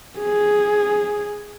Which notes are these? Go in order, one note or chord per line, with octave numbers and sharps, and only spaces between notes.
G#4